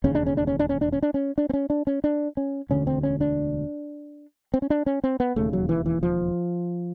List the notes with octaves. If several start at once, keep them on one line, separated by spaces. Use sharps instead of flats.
E1 D#2 C#3 C#4
D4
C#4
D4
C#4
D4
C#4
D4
C#4
D4
C#4
D4
C4
C#4
D4
C#4
D4
C#4
E1 D2 D3 C#4
C4
C#4
D4
C4
C#4
D4
C#4
C4
B3
E1 D#2 C#3 A3
F#3
E3
E3
F3